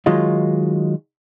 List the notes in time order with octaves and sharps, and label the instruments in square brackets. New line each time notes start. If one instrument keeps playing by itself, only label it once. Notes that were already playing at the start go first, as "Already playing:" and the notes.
[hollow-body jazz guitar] D#3 F#3 G#3 D#4 F4